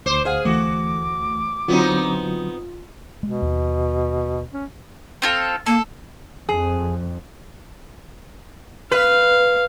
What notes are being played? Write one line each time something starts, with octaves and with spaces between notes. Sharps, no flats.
D2 C5 D6
G#4 C5 F5 F#5 F6
E3 A3 F#4 D6
D3 F#3 B3 C4 D#4 F4
B2 G#3
D#2
C#4
C4 F4 A4
A#3 A4
F2 G#4
B4 F5